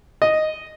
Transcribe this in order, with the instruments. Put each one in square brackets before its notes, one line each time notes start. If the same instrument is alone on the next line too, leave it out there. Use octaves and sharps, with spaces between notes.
[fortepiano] D#5